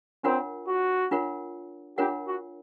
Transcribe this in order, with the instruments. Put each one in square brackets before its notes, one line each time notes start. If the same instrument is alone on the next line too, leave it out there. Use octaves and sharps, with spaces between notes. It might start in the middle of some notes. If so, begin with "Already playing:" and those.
[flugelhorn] C4 [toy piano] D4 F4 A#4 C#5 F#5
[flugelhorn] F#4
[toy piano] D4 F4 A#4 C#5 F#5
[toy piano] D4 F4 A#4 C#5 F#5 [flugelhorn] G4
[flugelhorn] F#4